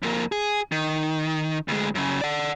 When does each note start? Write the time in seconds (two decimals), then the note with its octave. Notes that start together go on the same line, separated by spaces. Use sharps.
0.03 F2 A#3
0.32 G#4
0.72 D#3
1.68 D2 G#3
1.95 F#2 C#3
2.21 D5 F#5